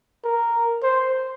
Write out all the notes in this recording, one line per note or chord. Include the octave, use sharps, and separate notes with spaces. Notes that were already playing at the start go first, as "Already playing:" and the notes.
A#4
C5